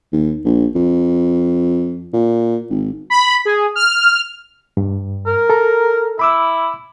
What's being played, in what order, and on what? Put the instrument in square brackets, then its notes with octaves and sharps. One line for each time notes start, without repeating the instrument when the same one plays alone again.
[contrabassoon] D#2
A#1
F2
A#2
G#1
[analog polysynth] B5
G#4
F6
[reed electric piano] G2
[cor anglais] A#4
[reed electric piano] A4 A#5
[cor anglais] E4 [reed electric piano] B5 D6 E6